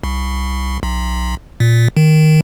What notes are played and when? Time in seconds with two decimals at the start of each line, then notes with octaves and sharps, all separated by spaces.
0.04 C2
0.83 B1
1.60 A#2
1.97 D#3